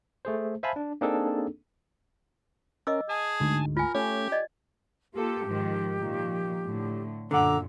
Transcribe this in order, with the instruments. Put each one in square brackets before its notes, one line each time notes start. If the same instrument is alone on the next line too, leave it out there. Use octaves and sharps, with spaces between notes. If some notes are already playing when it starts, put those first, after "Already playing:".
[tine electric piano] A3 G#4 C5
C5 E5 F5 G#5 A5 B5
D4
A#3 C4 D4 D#4 G#4 A4
[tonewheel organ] C#4 A#4 [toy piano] D#5 D6 E6
[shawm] G#4 [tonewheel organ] G#5 A5
[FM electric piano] D2 G#2
[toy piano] F4 G#5 [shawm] A#4
[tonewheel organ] A3 G#6 [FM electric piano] C#4 [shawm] G4
[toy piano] D5 D#5
[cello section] A#3 F4 A4 [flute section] G4
[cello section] G#2 D#3 F3
A#2 D#3 F3
A2 D3
[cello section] F#2 A#2 [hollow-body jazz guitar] D3 F#5 [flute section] A#5 D6 E6